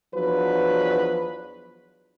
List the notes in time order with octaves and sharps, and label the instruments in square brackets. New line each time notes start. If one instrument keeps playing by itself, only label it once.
[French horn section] E2 F3 F#3 D4 B4